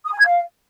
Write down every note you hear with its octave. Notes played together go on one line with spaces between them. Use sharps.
D#6
G#5
G#6
F5